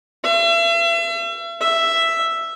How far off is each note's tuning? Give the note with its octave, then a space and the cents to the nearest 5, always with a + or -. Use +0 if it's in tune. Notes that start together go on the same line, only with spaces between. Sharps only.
E5 +40
E5 +5